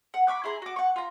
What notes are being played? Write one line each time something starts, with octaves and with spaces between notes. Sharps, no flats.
F#5
B5 C#6 D6 F#6
E4 G#4 A#5 C6
F#4 D6
F#5 C#6
F4 A#5